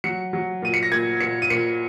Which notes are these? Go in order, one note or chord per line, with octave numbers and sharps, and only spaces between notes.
F#3 C#7
F#3
A#2 D#7
C#7
A#6
A#2 G#6
A#2 C#7
D#7
A#2 C#7